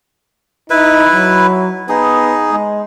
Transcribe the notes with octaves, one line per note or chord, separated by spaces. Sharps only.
D#4 E4 B4
F#3
B3 D#4 G#4
G#3